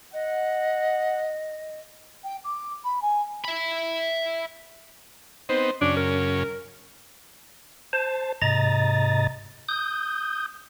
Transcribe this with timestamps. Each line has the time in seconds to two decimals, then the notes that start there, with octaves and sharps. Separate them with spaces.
0.13 D#5 F#5
2.23 G5
2.44 D6
2.84 B5
3.01 G#5
3.45 E5 B5
5.49 B3 C4 D#4 C5
5.81 F#2 C#3 C#4 D4
5.97 A#4
7.93 C5 A5
8.42 G#2 C3 D#5 A#5 A6
9.69 D#6 G6